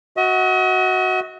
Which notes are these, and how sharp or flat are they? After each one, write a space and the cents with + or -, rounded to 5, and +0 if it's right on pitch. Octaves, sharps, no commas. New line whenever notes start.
F#4 +0 D#5 +45